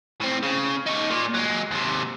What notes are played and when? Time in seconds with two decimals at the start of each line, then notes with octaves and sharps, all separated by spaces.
0.21 A2 C4
0.43 C#3
0.87 D#4 C#5
1.10 A#2
1.34 F#3 G#3
1.71 D#2 C3